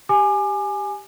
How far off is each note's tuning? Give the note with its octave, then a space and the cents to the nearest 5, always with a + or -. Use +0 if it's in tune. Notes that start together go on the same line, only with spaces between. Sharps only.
G4 +0 G#5 +0 D6 +35